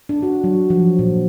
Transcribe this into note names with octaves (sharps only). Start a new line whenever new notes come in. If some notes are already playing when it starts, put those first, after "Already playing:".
D4
F#4
F#3
F3
A#2